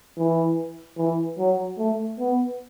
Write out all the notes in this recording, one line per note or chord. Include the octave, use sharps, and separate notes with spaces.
E3
E3
F#3
A3
B3